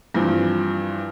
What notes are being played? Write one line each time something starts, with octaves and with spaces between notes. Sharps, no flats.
G2 E3 F3 C4